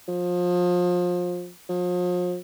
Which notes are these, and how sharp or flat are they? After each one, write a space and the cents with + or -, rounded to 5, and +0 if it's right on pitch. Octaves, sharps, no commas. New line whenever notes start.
F3 +30
F3 +40